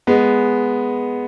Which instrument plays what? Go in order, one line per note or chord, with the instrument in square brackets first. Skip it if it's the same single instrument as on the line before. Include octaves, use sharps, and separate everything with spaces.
[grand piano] G#3 B3